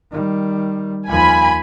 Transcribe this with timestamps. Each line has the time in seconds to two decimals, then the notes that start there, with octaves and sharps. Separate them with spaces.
0.12 D#3 G3
1.08 D#2 F3 G#5 B5